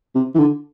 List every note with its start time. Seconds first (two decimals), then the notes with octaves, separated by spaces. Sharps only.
0.15 C3
0.35 E3
0.39 D3